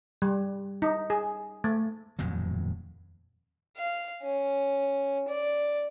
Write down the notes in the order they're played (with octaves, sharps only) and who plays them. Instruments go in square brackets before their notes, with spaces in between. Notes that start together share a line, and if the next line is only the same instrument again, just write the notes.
[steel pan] G3
D#4
G#4
A3
[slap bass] D#1 F2 A2 F#3
[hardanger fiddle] F5
C#4
D5